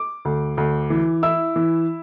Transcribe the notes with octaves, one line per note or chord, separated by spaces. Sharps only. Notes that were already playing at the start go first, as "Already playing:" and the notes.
Already playing: D6
D2
D2
E3
E4 E6
E3